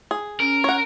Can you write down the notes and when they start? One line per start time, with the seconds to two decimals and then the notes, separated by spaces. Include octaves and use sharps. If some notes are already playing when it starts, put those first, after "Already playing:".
0.11 G#4
0.40 C#4 A#4
0.64 C#5 F#5